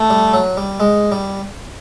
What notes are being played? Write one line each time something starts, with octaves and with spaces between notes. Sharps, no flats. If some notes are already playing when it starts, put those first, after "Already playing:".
Already playing: A3
G3
F#3
G3
G#3
G3